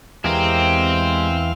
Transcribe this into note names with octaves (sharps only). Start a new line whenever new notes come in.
E2 E3 G#3 C4 G4 A#4 F5